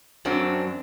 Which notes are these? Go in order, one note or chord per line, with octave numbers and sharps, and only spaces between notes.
F#2 F#3 C4 D4